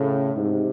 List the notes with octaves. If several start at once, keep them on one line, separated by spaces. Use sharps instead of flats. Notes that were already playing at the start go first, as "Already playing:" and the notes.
Already playing: A2 C#3
G#2 C3